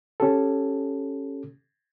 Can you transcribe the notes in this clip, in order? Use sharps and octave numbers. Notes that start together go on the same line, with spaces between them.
C#4 G4 A4